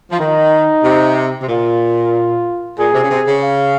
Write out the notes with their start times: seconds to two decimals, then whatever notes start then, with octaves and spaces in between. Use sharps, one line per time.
0.11 F3
0.20 D#3 D#4
0.84 C3
1.42 C3
1.49 A#2 F4
2.79 A#2 G#4
2.94 C3
3.04 C#3
3.11 C3
3.27 C#3
3.43 F5